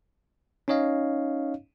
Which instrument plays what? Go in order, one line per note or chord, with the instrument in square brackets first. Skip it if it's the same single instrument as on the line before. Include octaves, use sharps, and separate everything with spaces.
[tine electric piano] C#4 D#4 C#5 D#5 F5